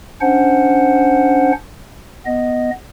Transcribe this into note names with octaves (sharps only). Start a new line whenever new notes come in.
C#4 D4 C5 F#5
B3 D#5